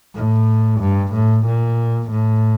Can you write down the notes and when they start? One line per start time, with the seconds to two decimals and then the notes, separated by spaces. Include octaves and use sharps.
0.15 A2
0.80 G2
1.13 A2
1.46 A#2
2.10 A2